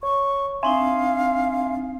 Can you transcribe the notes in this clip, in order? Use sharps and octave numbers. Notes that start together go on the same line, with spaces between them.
C#5 C#6
C4 D4 D#4 E5 F5 G#5 C6